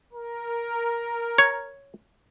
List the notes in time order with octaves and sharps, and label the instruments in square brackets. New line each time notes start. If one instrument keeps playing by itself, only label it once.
[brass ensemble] A#4
[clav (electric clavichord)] C#5